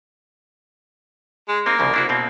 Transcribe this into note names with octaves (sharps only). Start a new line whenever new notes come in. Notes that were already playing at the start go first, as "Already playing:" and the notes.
G#3
A#3 C4 D#4
C2 C#3 F3
D4 E4 F#4
B2 A#3 C4